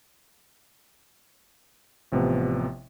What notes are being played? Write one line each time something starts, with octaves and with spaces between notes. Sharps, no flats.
A1 C3 F3 B3